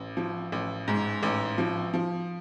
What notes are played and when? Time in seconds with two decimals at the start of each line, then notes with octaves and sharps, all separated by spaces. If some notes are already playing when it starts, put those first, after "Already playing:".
Already playing: A1
0.17 F3
0.52 A1
0.88 G#2
1.23 A1
1.58 F3
1.94 F3